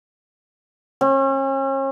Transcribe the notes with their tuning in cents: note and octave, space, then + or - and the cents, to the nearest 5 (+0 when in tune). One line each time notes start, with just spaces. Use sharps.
C#4 -40